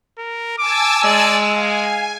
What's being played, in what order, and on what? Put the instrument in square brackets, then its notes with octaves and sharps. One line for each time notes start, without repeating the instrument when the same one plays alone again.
[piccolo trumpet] A#4
[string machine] G#5 A5 E6 [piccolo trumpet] D6
[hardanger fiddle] G#3 [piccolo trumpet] D5
[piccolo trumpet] F5 [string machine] G#5